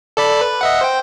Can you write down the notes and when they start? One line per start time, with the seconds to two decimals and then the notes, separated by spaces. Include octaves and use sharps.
0.17 A4 D5 B5
0.41 B4
0.61 D#5 E5 F#5
0.81 C5 G5